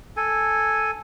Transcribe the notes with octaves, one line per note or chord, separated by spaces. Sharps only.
A4 G#5